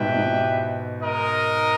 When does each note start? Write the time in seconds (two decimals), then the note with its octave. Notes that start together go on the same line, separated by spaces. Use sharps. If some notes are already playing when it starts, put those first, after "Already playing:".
Already playing: G#2 B2 E4 G4 B4 E5 G5
0.15 G#2
1.00 G#3 D#4 A#4 D#5